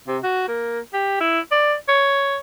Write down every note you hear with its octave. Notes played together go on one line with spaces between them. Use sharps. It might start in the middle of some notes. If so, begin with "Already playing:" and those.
C3
F#4
A#3
G4
E4
D5
C#5